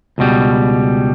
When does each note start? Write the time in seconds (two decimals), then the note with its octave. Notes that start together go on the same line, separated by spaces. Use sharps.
0.18 C#2 B2 G3